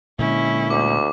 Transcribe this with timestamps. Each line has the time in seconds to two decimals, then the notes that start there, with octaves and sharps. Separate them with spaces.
0.19 A#2 D3 G#3 C#4 E4
0.70 D2 D6